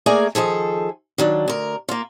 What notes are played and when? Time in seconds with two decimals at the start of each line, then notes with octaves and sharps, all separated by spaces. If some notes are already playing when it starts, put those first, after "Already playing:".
0.06 A3 A#3 G#4 A#4 D5 G#5
0.35 D#3 F3 G#4 A4
1.18 D#3 F#3 D4
1.48 D2 A#4
1.89 A#3 F4